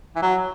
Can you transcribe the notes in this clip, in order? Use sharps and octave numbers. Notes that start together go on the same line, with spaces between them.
E3
F#3